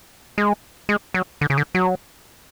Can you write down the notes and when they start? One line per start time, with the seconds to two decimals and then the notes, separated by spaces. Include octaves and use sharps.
0.38 G#3
0.89 G#3
1.14 F#3
1.41 D3
1.50 C#3
1.58 D3
1.75 F#3